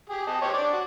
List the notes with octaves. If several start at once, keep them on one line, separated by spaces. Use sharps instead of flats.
G4 G#4
D#5 A5
G4 C5 C#5
D4 D5 D6
F#4